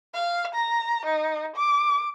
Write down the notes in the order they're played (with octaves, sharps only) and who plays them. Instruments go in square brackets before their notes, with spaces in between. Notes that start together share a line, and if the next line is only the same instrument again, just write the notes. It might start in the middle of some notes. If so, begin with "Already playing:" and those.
[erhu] F5
A#5
D#4
D6